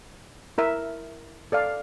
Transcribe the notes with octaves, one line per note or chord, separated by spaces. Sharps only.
E4 A#4 E5
A4 D5 F5